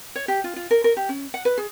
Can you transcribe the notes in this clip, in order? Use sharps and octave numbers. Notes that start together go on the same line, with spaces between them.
C#5
G4
F4
F4
A#4
A#4
G4
C#4
F#5
B4
G#4